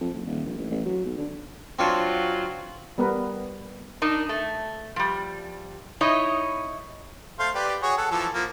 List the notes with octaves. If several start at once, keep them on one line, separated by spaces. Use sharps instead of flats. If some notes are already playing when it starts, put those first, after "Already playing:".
F2
F#1
D#1
A#1
A1
A1
F#3
B1
D3
F#3 C4 D4 F4 C#5
G3 B3 A#4 B4
D4 D#4 A#4
A3
F3 G3
D#4 E4 C#5 D#5
A3 C5 F5
G4 B4 D5
F#4 G#4 C#5
A4 F#5
E3 F3 A4
F3 A#3